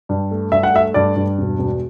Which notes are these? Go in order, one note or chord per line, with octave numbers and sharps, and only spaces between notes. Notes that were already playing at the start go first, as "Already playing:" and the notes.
G2
A3
G2 E5
F#5
A3 E5
G2 D5
G2
E1
E1